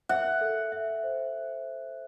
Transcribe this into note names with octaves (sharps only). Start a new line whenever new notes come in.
E5 F#5
A4
E5
C5